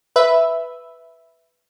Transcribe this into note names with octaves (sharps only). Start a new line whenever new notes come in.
B4 E5